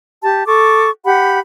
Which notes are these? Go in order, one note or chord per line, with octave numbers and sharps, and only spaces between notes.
G4 A5
A4 C#6 D6
G4 F#5 B5